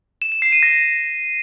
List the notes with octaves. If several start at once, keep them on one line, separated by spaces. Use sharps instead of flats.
E7
E7
C7
D#7
A#6